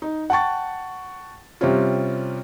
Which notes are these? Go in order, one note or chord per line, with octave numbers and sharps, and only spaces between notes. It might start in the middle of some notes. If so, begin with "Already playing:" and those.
D#4
F#5 G5 A5 C#6 A6
C3 G3 C4 C#4 F4